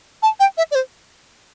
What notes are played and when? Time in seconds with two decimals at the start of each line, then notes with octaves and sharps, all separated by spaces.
0.22 A5
0.40 G5
0.57 E5
0.71 D5
0.75 C5